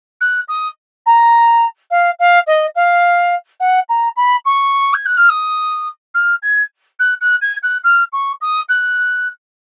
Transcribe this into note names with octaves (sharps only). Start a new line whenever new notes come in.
F#6
D#6
A#5
F5
F5
D#5
F5
F#5
A#5
B5
C#6
G#6
F#6
F6
D#6
F6
G#6
F#6
F#6
G#6
F#6
F6
C#6
D#6
F#6